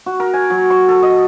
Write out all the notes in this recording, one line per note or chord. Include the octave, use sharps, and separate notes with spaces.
F#4
A#4
G#5
F#3
C#6
A4
D#5